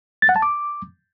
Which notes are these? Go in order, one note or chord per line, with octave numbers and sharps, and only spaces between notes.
A6
F#5
A5
D6